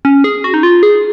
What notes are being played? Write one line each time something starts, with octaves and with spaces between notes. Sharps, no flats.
C#4
G#4
F#4
D#4
F4
G#4